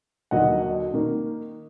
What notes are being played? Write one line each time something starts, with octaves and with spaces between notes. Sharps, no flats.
D#2 D3 F#3 A#3 D#5 F#5
D#5
D#3 A#3